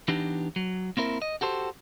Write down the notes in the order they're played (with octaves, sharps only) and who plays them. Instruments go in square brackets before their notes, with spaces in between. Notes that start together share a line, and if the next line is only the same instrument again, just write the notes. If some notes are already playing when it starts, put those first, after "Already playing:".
[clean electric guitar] E3 B3 D4 D#4 G4
F#3
A#3 C4 E4 A#4
D#5
F#4 G4 A4 C5